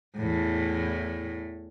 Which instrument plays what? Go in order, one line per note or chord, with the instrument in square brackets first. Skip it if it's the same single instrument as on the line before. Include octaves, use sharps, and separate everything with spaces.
[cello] E2 A2